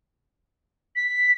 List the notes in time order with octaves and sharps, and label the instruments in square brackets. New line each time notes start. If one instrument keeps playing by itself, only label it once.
[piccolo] B6